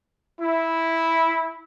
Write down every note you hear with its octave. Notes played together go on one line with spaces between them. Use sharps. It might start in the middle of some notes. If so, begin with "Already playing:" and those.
E4